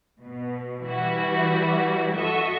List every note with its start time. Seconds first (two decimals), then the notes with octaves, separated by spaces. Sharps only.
0.20 B2
0.84 E3 G3 E4 F#4
2.14 F#4 A4 D#5 E5 C#6